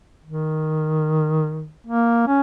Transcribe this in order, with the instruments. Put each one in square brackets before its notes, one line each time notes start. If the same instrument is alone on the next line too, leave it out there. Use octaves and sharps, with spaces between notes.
[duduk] D#3
A#3
C#4